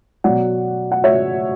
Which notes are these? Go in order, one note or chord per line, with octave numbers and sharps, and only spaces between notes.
B2 F#3 D5 F#5
F#5
C#5 E5